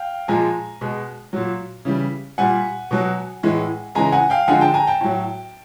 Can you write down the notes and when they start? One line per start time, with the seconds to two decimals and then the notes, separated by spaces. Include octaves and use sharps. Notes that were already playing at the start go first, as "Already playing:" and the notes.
Already playing: F5 G5
0.28 A#2 F3 G#3 G#5 A#5
0.81 B2 G#3
1.33 A#2 F#3
1.85 C#3 E3 G3
2.38 A#2 G3 F#5 G#5
2.91 B2 F#3
3.43 A2 E3 G#3
3.95 C#3 E3 G#3 G#5 A#5
4.12 F#5 G#5
4.30 F5 G5
4.48 D3 F3 G#3 F#5 G#5
4.61 G5 A5
4.74 G#5 A#5
4.87 G5 A5
5.01 A2 F#3